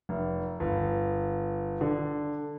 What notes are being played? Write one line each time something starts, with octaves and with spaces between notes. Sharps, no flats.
F1
G1
D3